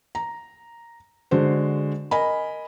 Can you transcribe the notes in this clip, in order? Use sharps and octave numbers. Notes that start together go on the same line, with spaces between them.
A#5
D3 G#3 F#4 C5
A#4 D#5 G#5 B5